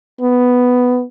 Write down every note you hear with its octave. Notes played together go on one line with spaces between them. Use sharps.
B3